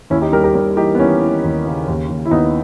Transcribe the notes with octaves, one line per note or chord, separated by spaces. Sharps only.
D#2 C#4 E4
D#4 G4
G3 G4 A#4
G4 A#4
G3 G4 A#4
E3 D#4 G4
B3
E3 C#4
E3
D#2
C#3
D#2
D#2
E4
D#2 B3 D#4